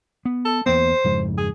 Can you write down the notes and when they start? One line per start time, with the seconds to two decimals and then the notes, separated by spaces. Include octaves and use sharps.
0.25 B3
0.45 A4
0.66 E2 A#3 B3 C5
1.04 F2 G#2 C#3
1.38 G#4